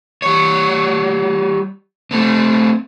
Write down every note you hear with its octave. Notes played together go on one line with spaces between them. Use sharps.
G3 C#5
A3 C4